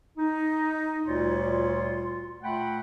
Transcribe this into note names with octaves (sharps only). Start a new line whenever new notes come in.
D#4
D2 A#2 G3 F4 C#5 C6
A#2 A3 F#5 G5 B5 C6